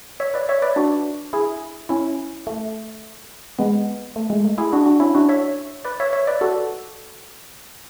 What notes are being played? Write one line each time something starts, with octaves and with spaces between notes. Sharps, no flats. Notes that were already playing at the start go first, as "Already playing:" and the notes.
C#5 E5
B4 D5
C#5 E5
B4 D5
D4 F#4
E4 G#4
C#4 E4
A3
G#3 B3
A3
G#3
A3
E4 G#4
D4 F#4
D4 F#4
C#4 E4
D4 F#4
C#5 E5
B4 D5
C#5 E5
C#5 E5
B4 D5
F#4 A4